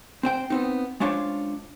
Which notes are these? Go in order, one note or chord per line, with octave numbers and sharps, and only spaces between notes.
C4 C5 G5
B3 C4 D#4
G#3 C#4 D4 F4 C5 C#5